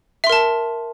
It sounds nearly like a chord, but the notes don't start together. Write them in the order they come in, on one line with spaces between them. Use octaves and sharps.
E5 C6 A#4 A5